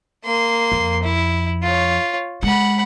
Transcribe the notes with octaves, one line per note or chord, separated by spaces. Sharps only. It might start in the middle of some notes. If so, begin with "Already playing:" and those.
A#3 C6
F2
E4
F4 C#5
G#3 F#5 B5